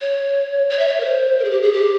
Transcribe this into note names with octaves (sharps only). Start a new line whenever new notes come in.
C#5
C#5
E5
C#5
A#4
C5
A#4
G#4
G4
G#4
G4